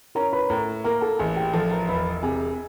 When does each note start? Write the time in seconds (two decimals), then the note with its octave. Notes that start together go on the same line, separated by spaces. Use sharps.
0.15 C#4 A#4 A#5
0.33 B4 B5
0.50 A2 A#4 A#5
0.84 A#3 A#4 A#5
1.01 A4 A5
1.19 A1 G#4 G#5
1.36 G4 G5
1.53 F3 A4 A5
1.71 A#4 A#5
1.88 E1 B4 B5
2.22 C3 G#4 G#5